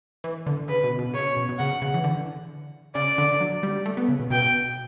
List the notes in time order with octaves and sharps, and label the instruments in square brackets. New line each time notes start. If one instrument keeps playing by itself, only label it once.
[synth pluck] E3
D3
[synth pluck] C#3 [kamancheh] B4
[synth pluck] B2
B2
[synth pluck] C#3 [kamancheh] C#5
[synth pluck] B2
B2
[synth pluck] C#3 [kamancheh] F#5
[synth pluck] C#3
E3
D3
[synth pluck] C#3 [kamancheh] D5
[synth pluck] D3
F#3
G3
A3
B3
C#3
B2
[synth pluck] B2 [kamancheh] G5